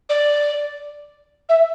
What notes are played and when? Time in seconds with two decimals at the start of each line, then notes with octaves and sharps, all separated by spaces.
0.09 D5
1.49 E5